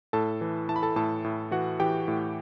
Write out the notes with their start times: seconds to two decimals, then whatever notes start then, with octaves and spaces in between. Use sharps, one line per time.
0.13 A2 A4 A5
0.41 E3
0.69 E3 A5
0.76 B5
0.83 A4 A5
0.96 A2 A4 A5
1.24 A2
1.51 E3 F#4 F#5
1.80 E3 G4 G5
2.08 A2